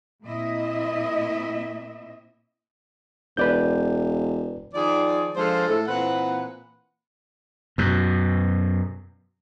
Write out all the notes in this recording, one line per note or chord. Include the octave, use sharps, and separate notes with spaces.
A#2 A#3 C4 E4 D#5 E5
E1 B4 D5 G6
D#3 F3 G#4 D5
F3 G#3 D4 F4 A4 C5
A2 A4
A#2 E3 C4 B4 F#5
F#2 B2